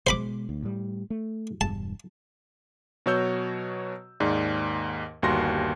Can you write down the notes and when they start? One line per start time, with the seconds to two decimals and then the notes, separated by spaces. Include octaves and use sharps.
0.07 B2 G#3 C5 B5 D6
0.49 D2
0.63 A2 G3
1.10 A3
1.61 E1 G2 A5
3.06 B2 F#3 F#4 C#5 E6 G6
4.20 D#2 G#2 D5
5.23 G1 D#2 G3 F#4 C6 A#6